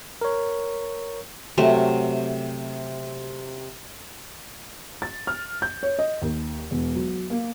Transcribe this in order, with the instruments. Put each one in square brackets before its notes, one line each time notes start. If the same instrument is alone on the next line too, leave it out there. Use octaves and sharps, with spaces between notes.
[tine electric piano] A#4 C#5
[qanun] C3 F#3 A3 A#4
[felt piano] A6
F6
G6
C#5
D#5
D#2
E1
F#3
A#3